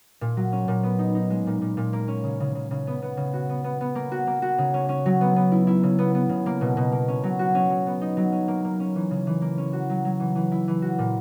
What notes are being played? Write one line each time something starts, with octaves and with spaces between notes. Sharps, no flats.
A#2
F#3
C#4
A#2
B3
D#4
D#4
G#3
A#2
A#2
A#2
A#3
C#4
C#3
C#3
C#3
C#3
B3
B3
C#3
F#4
B3
B3
B3
A#3
F#4
A#3
F#4
C#3
C#4
C#4
F#3
B3
B3
E4
E4
C#3
B3
B3
C#3
A#3
B2
B2
A#3
C#4
F#3
F#4
C#4
F#3
B3
D#4
F#3
C#4
A#3
A#3
C#4
E3
C#3
E3
A#3
C#4
F#4
F#3
F#3
E3
E3
E4
E3
F#4
A#2